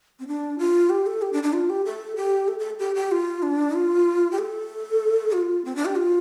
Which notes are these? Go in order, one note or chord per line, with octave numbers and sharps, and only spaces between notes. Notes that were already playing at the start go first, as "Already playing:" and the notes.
C4
D4
F4
G4
A4
G4
D4
D4
F4
G4
A4
G4
A4
A4
G4
G4
F4
D4
F4
G4
A4
F4
C4
D4
G4
F4